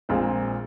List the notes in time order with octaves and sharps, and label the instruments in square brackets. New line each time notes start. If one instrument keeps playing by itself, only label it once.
[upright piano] A#1 A#2 G#3 C4 F4